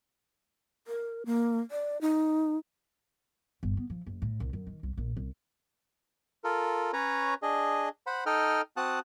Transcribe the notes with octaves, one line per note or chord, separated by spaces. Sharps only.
A#4
A#3
D5
D#4
G1
B3
F3
F#1
A2
C2
F#2
D#3
C2
A#1
C2
F4 A4 A#4
C#4 B4 C#5 A#5
D4 G#4 D#5
C5 F#5 B5
D#4 A4 D#5 G5 F6
C4 F#4 F#5 A5 D#6 F#6